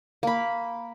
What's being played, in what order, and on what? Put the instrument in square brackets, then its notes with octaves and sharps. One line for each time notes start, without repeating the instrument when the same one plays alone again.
[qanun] A#3 B5